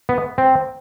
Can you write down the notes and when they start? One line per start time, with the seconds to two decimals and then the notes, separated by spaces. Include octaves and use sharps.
0.09 B3
0.38 C4